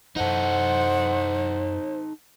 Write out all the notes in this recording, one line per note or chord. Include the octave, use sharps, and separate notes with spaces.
F#2 E3 D#4 A4 C5 F#5